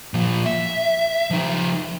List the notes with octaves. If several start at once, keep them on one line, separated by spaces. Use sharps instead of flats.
A#2 F3
E5
F3 D#4